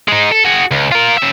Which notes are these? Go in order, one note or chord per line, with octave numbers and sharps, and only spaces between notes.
G#3 D#4
A4
F#4 G#4
C#2
F4 A#4
C#3 E5